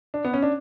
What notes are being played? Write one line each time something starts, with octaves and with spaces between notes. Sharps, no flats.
D4
B3
C#4
D4